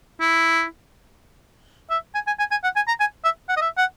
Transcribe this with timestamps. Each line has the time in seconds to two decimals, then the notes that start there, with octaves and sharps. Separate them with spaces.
0.20 E4
1.90 E5
2.15 G#5
2.27 G#5
2.39 G#5
2.51 G#5
2.64 F#5
2.76 G#5
2.88 A#5
3.00 G#5
3.24 E5
3.49 F#5
3.57 D#5
3.61 E5
3.78 F#5